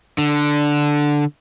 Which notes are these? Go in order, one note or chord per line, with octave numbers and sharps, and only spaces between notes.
D3